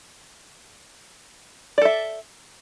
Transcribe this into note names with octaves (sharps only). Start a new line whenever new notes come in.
A4 D5 E5